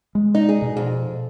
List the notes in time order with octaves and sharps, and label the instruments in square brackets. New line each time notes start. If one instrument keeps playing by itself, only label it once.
[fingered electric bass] G#3
[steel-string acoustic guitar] D#4
G#4
[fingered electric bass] B2
[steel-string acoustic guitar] F2